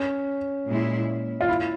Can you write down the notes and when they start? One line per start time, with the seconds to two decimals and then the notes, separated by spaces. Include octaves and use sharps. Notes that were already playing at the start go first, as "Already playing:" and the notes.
Already playing: C#4
0.67 A#2 G#3 E4
1.41 F4
1.49 E4